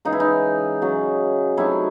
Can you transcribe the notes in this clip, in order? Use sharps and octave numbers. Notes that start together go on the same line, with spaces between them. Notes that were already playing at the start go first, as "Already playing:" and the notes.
C#3 E3 G#3 D#4
E4
D#4
C#3 F#3 C#4
C3 F#3 A3 D#4 E4